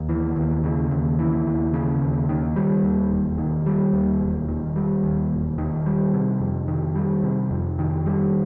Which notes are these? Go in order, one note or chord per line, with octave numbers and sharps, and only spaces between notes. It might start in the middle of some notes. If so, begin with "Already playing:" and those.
Already playing: D#2
E3
D#2
C#3
D#2
E3
D#2
C#3
D#2
D#3
G3
D#2
E1
D#3
G3
D#2
E1
D#3
G3
D#2
E1
D#3
G3
C3
F2
D#3
G3
C3
F2
D#3
G3